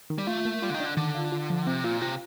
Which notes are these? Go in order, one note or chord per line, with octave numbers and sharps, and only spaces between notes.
D#3
G3
A3 F4
A#3
G3 F4
D3
D#3
D4
D3
D3 D#3
F4
F4
F3
C3 C4
A#2 F4
C3 F4